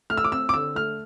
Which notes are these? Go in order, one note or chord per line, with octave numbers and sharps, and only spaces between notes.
A3 F6
E6
D6
C4 E6
D6
D3 E6
A3 F6